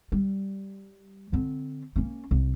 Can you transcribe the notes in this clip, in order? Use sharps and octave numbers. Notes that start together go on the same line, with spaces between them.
G3
D3 C4
A#3 C#4
C2